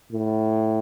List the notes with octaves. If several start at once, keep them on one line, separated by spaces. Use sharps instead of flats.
A2